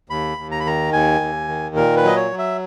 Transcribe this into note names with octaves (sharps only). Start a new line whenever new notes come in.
D#2 B5
D#2
A#5
B5
D#3 A#5
D#2 G#5
D#2
D#3
A#2 A#4
B4
F#3 D#5
C#5
F#3
E5